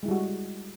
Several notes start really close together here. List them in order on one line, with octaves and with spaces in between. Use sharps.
G#3 E4 G3 F#4